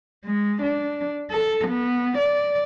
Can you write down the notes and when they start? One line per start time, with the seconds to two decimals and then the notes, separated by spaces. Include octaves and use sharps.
0.25 G#3
0.62 D4
1.31 A4
1.68 B3
2.18 D5